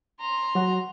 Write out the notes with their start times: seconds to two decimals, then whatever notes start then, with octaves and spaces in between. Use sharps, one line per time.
0.20 A#5 C6
0.55 F#3 F#4